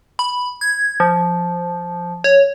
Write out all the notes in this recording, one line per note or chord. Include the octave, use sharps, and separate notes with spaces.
B5
G#6
F3
C#5